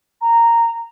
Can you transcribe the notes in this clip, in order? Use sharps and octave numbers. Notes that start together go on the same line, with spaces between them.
A#5